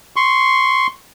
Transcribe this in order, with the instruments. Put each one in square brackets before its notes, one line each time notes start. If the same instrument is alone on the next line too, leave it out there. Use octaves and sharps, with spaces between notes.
[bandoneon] C6 C#6